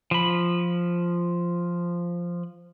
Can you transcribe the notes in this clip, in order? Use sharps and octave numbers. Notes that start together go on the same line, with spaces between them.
F3 B5